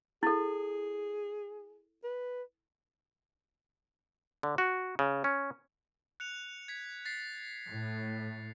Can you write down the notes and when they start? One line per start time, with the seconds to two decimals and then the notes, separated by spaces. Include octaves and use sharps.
0.23 E4 G#4 A4
2.04 B4
4.43 D3
4.58 F#4
4.99 C#3
5.24 C#4
6.20 F#6 C#7 F7
6.68 G#6 B6
7.05 A6 B6 C7
7.72 A2